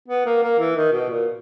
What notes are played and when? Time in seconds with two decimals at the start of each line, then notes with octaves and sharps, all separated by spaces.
0.08 B3
0.26 A#3
0.43 A#3
0.59 E3
0.77 D#3
0.92 B2
1.10 A#2